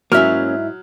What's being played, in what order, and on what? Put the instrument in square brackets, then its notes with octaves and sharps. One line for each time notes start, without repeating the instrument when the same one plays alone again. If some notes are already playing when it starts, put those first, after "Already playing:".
[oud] G#2 E4 E5 [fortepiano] F#3 [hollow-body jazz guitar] A#3 C#4 [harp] F6